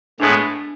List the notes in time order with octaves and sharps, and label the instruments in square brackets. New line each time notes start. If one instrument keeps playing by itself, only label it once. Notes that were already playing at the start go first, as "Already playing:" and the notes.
[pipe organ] A2 G#3 B3 [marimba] D4